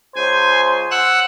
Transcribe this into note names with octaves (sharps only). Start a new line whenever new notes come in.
C#2 C#4 C5 G#5
F#5 E6 F#6